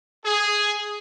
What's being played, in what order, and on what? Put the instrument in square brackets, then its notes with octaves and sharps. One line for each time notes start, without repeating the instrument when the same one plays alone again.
[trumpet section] G#4